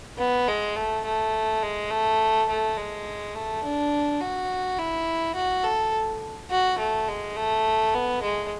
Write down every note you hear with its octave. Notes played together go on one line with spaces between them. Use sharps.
B3
G#3
A3
A3
G#3
A3
A3
G#3
A3
D4
F#4
E4
F#4
A4
F#4
A3
G#3
A3
B3
G#3